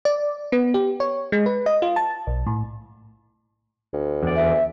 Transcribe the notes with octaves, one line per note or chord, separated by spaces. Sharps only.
D5
B3
G4
C#5
G#3
B4
D#5
F4
A5
B1
A2
D2
E2 D5
E5